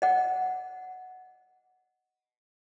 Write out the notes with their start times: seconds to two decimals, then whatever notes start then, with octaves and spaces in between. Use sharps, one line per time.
0.02 D#5 F#5